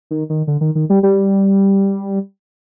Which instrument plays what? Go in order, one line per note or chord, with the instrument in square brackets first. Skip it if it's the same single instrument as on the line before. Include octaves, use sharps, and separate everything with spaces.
[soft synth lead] D#3
D#3
D3
D#3
D#3
G3
G3